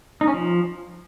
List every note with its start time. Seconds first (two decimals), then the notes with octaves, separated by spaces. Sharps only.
0.21 D#4
0.27 C#4
0.34 F3